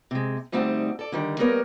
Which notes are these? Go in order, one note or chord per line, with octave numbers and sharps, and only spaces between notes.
C3 G#3
D2 G3 A3 C4 D#4 F#5
A4 D5
D3 D#3 G3
G3 A#3 B3 A#4 C#5